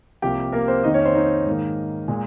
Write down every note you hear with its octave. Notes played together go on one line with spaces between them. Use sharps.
C2 C3 F3 A#3 G4 G5
A#3 A#4
C4 C5
F2 D#3 A#3 D#4 D#5
C#4 C#5
C4 C5
D#4
G#2 D#3 A#3
A#2 G#3